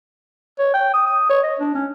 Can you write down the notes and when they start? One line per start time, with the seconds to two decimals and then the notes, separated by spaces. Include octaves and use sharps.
0.59 C#5
0.74 G5
0.93 D#6
1.07 D#6
1.29 C#5
1.43 D#5
1.60 D4
1.75 C#4